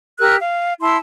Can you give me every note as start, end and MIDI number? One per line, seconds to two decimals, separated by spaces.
0.19 0.36 67
0.19 0.36 70
0.19 0.36 88
0.19 0.36 90
0.40 0.74 77
0.81 0.97 64
0.81 0.97 81
0.81 0.97 84
0.81 0.97 88